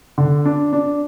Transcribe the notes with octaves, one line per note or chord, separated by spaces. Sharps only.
D3
D4
D4